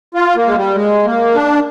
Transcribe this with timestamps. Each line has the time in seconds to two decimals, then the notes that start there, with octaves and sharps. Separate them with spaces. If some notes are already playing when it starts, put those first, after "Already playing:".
0.15 F4
0.35 A#3
0.46 G#3
0.55 G3
0.75 G#3
1.05 A#3
1.35 D4